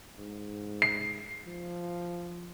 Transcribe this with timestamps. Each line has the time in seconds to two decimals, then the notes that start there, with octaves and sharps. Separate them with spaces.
0.18 G#2
0.82 C7
1.47 F3